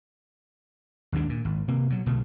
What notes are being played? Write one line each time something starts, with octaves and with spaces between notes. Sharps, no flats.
G#1 D#2 G#2 D4
A#2
G#1
C3 A#3
B2 F#3
B1 B2 D3 A3